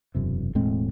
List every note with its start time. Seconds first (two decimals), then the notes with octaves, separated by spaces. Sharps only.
0.15 E1 F#2 C3
0.55 E1 A2 G#3 C4